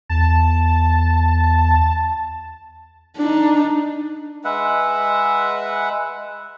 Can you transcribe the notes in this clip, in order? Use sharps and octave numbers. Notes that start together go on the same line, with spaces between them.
E2 A5
D4 D#4
G#3 B4 E5 F#5